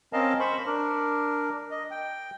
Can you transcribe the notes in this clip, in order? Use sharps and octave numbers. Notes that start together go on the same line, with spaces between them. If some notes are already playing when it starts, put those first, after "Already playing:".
C4 C#4 A#4 D#5 F5 A5
C5 B5 C#6
D4 A#4
D#5
G5